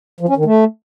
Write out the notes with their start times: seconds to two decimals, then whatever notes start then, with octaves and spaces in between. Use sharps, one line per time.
0.21 F3
0.29 C#4
0.37 D#3
0.45 A3